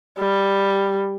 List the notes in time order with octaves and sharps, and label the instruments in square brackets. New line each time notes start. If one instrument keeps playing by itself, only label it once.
[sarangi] G3